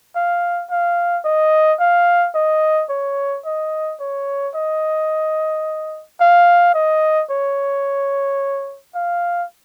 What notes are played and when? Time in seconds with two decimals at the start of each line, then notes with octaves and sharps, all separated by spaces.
0.16 F5
0.70 F5
1.24 D#5
1.79 F5
2.35 D#5
2.90 C#5
3.45 D#5
4.00 C#5
4.55 D#5
6.20 F5
6.74 D#5
7.30 C#5
8.95 F5